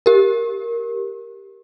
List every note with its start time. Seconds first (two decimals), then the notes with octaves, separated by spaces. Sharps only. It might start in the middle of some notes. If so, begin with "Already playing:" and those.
0.06 G4 A#4